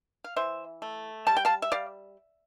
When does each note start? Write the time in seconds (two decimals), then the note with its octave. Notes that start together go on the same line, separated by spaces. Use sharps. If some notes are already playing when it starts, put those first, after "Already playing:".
0.24 F5
0.36 E3 C5 E5
0.82 A3
1.27 G3 A5
1.37 G5
1.45 F5 A5
1.62 E5
1.72 G3 D5 F5